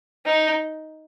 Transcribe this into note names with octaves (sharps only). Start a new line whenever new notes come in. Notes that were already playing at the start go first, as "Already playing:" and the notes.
D#4